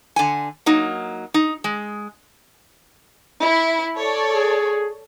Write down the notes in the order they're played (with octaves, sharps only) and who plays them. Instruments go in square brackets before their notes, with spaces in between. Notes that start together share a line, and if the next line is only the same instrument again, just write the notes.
[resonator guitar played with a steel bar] D3 G#5
F#3 A#3 D#4
D#4
G#3
[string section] E4
A4 C#5 D5
[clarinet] G#4